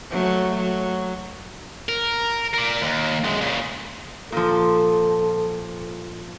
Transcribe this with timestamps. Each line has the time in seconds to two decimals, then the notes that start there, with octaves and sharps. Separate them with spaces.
0.10 F#3 A3
0.56 F#3
1.89 A#4
2.53 A#4 D5
2.81 D#2
3.24 F#2 G#3
3.41 A#2 C#3
4.32 A#2 F3 A4